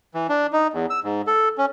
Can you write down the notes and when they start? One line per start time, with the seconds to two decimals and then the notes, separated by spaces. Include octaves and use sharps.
0.14 E3
0.29 D4
0.53 D#4
0.73 E2
0.90 E6
1.04 G#2
1.27 A4
1.58 C#4